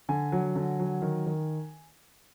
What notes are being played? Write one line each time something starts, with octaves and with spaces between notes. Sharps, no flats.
D3 G#5
F#3
D3
F#3
D#3
D#3